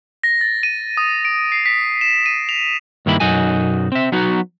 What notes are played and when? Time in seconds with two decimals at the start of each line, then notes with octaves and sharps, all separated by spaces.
0.24 A#6
0.41 A6
0.63 D#7
0.97 D#6
1.25 D7
1.52 C7
1.66 B6
2.01 E7
2.26 D#7
2.49 F7
3.06 G2 D#3 A#3 E4 B5
3.20 B1 F#2 D#4 F#4 G#5
3.92 C4 E5
4.12 F#3 B3 D#4 F#4